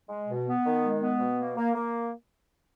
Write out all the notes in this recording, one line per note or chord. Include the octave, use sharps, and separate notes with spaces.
G#3
B2
B3
D#3
G#3
B3
B2
A#3
A#3
A#3